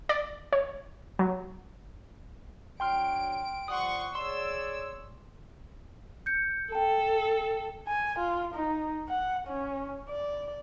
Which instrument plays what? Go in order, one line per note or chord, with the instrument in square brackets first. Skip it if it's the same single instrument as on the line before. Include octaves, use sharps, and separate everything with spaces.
[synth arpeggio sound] D5
C#5
F#3
[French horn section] F#3 D4 [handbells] G5 C6 F6 [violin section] D7
[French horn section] F3 G3 D5 [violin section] F#5 C6 C#6 [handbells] D#6
[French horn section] G#4 C#5 D5 [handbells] C6 [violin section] E6
[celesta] G6 C#7
[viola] A4 [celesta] G5 A5
[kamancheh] G#5
F4
D#4
F#5
C#4
D5